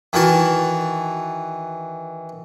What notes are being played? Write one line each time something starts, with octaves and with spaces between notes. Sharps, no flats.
D#3 E3 F#4 A5